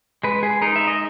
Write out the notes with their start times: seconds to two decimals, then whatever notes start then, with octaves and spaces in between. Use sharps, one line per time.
0.23 G#3 B4
0.43 G#4
0.62 D#4 A#4
0.76 E5
0.87 D#5